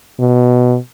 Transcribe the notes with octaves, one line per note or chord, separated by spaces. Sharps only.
B2